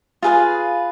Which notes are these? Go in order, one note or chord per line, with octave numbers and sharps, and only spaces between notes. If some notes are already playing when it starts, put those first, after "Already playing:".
F4 G#4 B4 F5